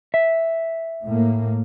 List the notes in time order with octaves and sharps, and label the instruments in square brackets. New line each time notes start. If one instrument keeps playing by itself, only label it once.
[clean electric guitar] E5
[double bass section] A2 A#3